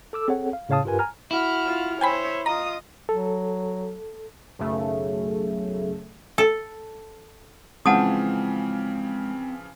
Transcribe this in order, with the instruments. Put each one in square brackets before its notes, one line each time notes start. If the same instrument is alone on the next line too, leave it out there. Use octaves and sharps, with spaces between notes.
[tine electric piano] A4 D6 E6
C4 G#4 A4 C#5 F#5
F5
A2 C#3 C#5 F5 A5 D#6
G2 F4 G4 A#4 B4 G#5
G#5 A#5 F6
[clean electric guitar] E4 [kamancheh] F#4 F6
[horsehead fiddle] F4
[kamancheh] C5 [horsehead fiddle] C#5 E5 [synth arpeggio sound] G5 G#5 B5
[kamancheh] F4 D#6 [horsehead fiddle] D#5 [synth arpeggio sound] A#5
[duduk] F#3 [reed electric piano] A4
[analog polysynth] B1 F#2 C#3 A3
[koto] A4
[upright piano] C#3 E3 F3 [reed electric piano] G#3 [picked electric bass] C4 [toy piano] F#5 A5 D#6